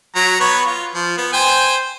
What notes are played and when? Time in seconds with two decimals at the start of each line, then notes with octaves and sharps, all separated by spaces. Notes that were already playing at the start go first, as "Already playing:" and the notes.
0.16 F#3 A#5
0.40 B3 B4 C#5
0.66 F4
0.95 F3
1.18 B3
1.33 C5 G5 G#5